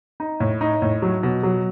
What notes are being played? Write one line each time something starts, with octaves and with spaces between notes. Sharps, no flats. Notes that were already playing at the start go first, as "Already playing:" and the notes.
D#4
A2
D#4
A2
F#3
B2
F#3